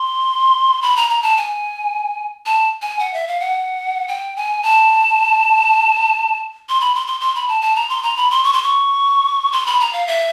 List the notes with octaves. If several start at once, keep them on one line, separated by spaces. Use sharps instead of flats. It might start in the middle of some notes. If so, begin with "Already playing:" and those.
Already playing: C6
B5
A#5
A#5
A5
G#5
A5
G#5
F#5
E5
F5
F#5
G5
G#5
A5
C6
B5
C6
C6
C6
B5
A5
A5
A#5
C6
A#5
B5
C6
C#6
C6
C#6
C6
B5
A#5
F5
E5